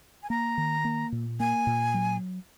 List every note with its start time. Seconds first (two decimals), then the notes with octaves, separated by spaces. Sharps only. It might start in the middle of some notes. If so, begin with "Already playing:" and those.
0.23 G#5
0.30 A#3 A#5
0.58 D#3
0.85 A#3
1.12 A#2
1.40 A#3 G#5
1.67 A#2
1.94 F#3